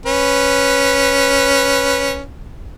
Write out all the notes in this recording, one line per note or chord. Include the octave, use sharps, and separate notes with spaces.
C#4 B4